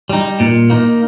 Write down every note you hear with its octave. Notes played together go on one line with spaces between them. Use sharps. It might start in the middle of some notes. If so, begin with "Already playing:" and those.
G3 D#4
A#2
A#3 D#4